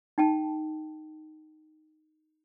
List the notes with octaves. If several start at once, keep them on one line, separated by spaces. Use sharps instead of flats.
D#4 G5 A5